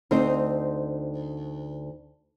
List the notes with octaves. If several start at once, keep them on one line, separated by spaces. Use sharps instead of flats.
D2 C4 D#4 C5